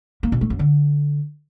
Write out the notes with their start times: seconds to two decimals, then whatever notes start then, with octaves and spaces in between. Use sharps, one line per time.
0.23 A#3
0.32 B2
0.41 A3
0.50 F#2
0.59 D3